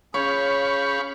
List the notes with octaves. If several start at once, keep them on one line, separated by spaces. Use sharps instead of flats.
C#4 G#4 C#5 F5 B5 C#6 G6